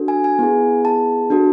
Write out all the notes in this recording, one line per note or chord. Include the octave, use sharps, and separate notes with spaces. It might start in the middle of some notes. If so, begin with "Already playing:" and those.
Already playing: D4 F#4 A4
G#5
G#5
B3 E4 G#4
A5
D4 F#4 A4